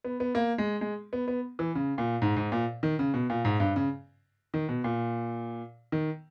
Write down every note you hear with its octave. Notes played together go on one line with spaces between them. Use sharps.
B3
B3
A#3
G#3
G#3
B3
B3
E3
C#3
A#2
G#2
G#2
A#2
D#3
C#3
B2
A#2
G#2
G2
C#3
D#3
B2
A#2
D#3